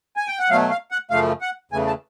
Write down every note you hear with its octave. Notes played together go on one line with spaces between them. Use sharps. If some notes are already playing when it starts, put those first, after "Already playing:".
G#5
G5
F#5
B2 F#3 A3 F5
F5
F#5
F#2 C#3 F3 A3 F5
F#5
E2 C#3 E3 A3 G#5
A5